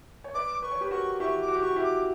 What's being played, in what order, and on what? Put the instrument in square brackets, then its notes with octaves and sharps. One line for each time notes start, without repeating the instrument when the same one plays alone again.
[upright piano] C#5
[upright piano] B4 D5 [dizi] D6
[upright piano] B4 [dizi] C#6
[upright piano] C#5
G4 B4
[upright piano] F#4 A#4 [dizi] C#6
[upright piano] E4 G4 [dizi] C#6
[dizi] D6
[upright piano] F#4
G4
[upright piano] F#4 [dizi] C#6
[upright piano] E4 G4
[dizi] D6